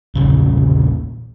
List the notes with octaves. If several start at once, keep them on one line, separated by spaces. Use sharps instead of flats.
A#1 E2 A#2 C#3